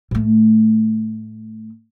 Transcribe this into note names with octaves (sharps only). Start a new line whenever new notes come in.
A2 A3